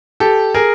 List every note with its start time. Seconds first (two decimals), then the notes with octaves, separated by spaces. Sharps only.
0.20 G4 A4
0.54 G#4 A#4